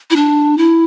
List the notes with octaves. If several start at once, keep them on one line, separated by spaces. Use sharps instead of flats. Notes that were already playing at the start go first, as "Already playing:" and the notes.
E4
D4
E4